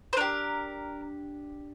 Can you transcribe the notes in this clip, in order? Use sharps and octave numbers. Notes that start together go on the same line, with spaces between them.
C5
D4 G4 A#4